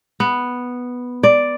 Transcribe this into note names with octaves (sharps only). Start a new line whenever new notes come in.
B3
D5